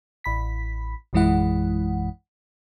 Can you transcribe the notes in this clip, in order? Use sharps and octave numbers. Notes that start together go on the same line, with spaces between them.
A1 B5 B6
A#1 F#2 E3 G#3 E4 F#5